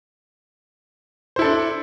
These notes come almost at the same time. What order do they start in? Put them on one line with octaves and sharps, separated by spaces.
C5 E4 A4 D4